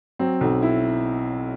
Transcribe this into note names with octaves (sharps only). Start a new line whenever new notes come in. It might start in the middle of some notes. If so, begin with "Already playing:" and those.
F#3 C4
B1
E4